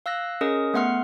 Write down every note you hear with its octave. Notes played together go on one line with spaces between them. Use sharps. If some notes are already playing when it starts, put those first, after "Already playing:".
F5 E6 F#6 A#6
C#4 G#4 A#4 D#5 D#6
A3 B3 F#5 C6 F6